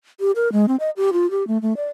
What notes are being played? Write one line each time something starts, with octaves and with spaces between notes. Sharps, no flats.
G4
A#4
G#3
C4
D#5
G4
F4
G4
A3
A3
D5